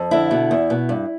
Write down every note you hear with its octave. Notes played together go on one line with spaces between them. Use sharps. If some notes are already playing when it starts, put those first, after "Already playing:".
Already playing: F2
D3 E4
B2
E2
B2
G2